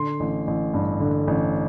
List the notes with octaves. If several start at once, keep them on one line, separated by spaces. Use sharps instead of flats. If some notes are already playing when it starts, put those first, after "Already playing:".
Already playing: D3 C6
A1
A1
G2
D3
A1